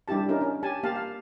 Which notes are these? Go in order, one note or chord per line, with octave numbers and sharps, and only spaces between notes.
G3 D4 E4 G4 A5
C#4 D#4 E4 A#4
C#4
G4 G#5 A5
A#3 G4 F5 A5
F5